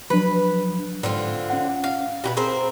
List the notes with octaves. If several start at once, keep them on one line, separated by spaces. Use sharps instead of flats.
F3 F#3 D4 B4
G#2 D3 C4 F4
C#4 F#5
F5
B2 G4 B4
C4 G#4 A#4 C5